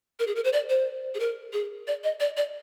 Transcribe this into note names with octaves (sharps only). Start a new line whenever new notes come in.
A#4
G#4
A#4
C5
D5
C5
G#4
A#4
G#4
D5
D#5
D5
D5